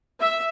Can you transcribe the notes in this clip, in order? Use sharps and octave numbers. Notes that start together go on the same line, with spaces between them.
E5